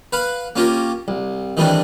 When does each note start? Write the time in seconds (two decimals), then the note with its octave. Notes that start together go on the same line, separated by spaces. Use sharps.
0.13 B4 F5 F#5
0.56 A#3 C#4 F4 G4 A#4
1.08 C2
1.57 D#3 E3 G3 A3 C4 D4